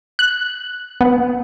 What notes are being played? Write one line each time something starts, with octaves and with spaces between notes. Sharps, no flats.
F#6
B3